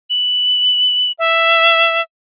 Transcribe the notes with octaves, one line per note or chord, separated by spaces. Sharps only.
F#7
E5